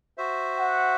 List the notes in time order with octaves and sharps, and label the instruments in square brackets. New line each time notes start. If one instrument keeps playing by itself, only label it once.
[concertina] F#4 C5 E5
[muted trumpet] F#5